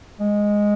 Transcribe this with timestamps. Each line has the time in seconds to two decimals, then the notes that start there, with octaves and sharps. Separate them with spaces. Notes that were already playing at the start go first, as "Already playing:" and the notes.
0.20 G#3